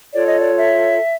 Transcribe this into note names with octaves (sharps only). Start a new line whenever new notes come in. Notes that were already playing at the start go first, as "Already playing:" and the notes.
F4 A4 C#5 D5
D#5
D5
E5